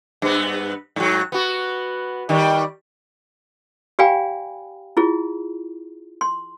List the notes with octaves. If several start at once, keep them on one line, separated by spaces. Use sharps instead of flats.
G2 B3
G#2 F#3
B3 F#4
D#3 G3
G4 D5 F5 G5 G#5 B5
E4 F4 G#4
C6